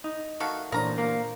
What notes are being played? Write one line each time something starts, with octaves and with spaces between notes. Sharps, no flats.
D#4
D#3 A3 F#4 F5
A1 A#2 D4 A#4 C5 A#5 D#6
A#3